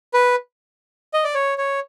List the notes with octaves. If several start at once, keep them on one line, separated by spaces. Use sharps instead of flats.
B4
D#5
D5
C#5
C#5